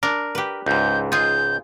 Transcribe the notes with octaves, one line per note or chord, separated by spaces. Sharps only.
D4 A#4
G4 B4
C#2 G#2 G6
F4 G#4 G6